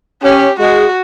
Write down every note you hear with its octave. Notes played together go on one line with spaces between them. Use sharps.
C#4 G4
G#3 F#4